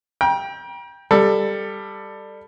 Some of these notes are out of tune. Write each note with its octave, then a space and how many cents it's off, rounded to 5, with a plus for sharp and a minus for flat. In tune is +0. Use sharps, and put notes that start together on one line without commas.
G5 +10 A#5 +45
G3 +15 A4 +15